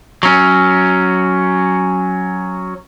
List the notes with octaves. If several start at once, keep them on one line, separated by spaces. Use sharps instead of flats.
F#3 C#4